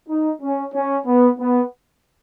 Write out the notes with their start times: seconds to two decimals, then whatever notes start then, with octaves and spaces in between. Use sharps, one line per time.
0.08 D#4
0.42 C#4
0.73 C#4
1.06 B3
1.39 B3